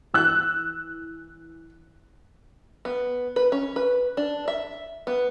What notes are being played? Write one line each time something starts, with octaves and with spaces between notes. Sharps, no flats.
E3 E6 F#6
B3
B4
C#4
B4
D4
E5
B3